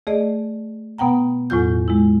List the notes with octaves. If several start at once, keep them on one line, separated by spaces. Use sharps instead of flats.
A3 G#4 D5 D#5
B2 B3 F#5 G5 A#5
E2 A2 F#3 F4 G6
G#3 E4